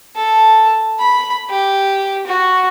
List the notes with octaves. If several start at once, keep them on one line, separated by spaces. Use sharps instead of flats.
A4
B5
G4
F#4